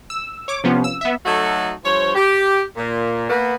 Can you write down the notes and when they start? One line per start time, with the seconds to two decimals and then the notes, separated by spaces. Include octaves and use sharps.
0.10 E6
0.48 C#5 D6
0.64 C3 F3 B3 C#4 F4
0.84 E6
1.01 B3 E5
1.25 F#3 A3 D#4 F#4 A4
1.83 G2 F3 C5 C#5
2.15 G4
2.76 A#2
3.29 A#3 B3